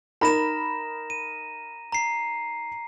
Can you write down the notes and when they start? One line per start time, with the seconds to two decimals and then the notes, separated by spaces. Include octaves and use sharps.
0.21 D#4 A#4 A#5 B5 A#6 E7
1.10 D#7
1.92 A#5 C7